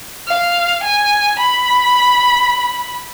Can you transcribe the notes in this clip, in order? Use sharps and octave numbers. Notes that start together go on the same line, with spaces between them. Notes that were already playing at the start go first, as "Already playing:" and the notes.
F5
G#5
B5